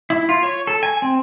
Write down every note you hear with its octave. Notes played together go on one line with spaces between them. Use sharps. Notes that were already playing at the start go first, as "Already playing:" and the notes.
E4
F4
C#5
A4
G#5
C4